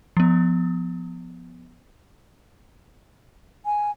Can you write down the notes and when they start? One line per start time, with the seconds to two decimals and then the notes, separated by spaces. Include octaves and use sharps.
0.17 F3 B3
3.66 G#5